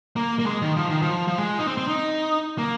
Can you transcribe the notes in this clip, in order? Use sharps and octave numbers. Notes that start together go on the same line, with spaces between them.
A#3
A#3
G#3
D#3
F3
D#3
F3
F3
G#3
D#4
C4
C4
D#4
A#3